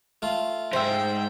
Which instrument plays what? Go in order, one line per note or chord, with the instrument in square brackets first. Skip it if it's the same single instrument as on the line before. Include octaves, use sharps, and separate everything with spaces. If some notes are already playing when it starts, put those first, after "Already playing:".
[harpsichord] A3 F4
[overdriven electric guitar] F2 G#2 [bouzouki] C5 E5 [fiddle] G5